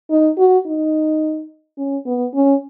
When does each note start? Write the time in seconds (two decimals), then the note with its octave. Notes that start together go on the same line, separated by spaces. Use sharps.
0.10 D#4
0.38 F#4
0.66 D#4
1.78 C#4
2.06 B3
2.35 C#4